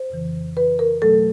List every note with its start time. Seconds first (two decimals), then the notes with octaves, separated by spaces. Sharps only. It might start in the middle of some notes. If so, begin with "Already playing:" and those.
Already playing: C5
0.10 F2 C#3 E3
0.57 B4
0.79 A#4
1.02 B2 F#3 A3 A4